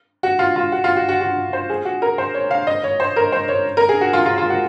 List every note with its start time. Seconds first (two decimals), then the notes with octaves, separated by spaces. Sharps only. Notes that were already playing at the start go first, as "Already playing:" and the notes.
0.23 F#4
0.39 F4
0.56 F4
0.72 F#4
0.84 F4
0.96 F#4
1.09 F#4
1.21 F#4
1.53 C5
1.70 G#4
1.85 F#4
2.02 A#4
2.18 C5
2.34 C#5
2.51 F5
2.67 D#5
2.84 C#5
3.00 C5
3.16 A#4
3.32 C5
3.48 C#5
3.77 A#4
3.89 G#4
4.01 F#4
4.13 F4
4.26 F4
4.38 F4
4.50 F#4